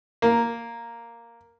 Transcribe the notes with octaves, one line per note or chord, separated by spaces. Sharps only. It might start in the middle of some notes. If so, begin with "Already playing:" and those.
A#3